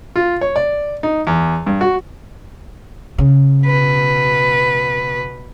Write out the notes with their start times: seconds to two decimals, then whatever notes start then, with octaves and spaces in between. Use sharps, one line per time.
0.16 F4
0.41 C#5
0.56 D5
1.03 D#4
1.27 E2
1.67 G2
1.81 F#4
3.18 C#3
3.63 B2 B4